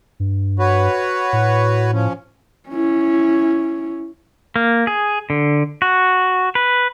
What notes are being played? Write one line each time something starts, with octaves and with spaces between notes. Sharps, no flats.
G2
F#4 B4 C#5
A2
F3 C#4
C#4 E4
A#3
G#4
D3
F#4
B4